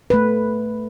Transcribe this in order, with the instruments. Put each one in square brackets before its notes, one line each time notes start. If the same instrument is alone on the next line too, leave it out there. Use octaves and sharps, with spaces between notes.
[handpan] A3 B4